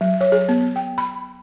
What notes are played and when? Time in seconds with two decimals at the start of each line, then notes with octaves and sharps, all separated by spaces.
0.01 F#3
0.21 C#5
0.32 G#4
0.49 B3
0.76 G5
0.98 B5